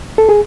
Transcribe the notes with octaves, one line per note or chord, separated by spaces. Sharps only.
A4
G#4